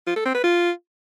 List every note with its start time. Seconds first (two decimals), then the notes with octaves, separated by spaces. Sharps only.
0.07 F4
0.16 A4
0.25 C4
0.34 B4
0.44 F4